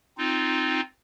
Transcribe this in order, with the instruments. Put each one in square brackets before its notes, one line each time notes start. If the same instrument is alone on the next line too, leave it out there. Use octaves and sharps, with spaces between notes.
[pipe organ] C4 D#4 F4